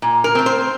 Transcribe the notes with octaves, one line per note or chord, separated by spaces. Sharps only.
A#2
A#4
A3 C4
C5